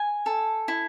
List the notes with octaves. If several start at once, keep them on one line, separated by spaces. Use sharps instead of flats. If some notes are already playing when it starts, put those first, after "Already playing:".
Already playing: G#5
A4
E4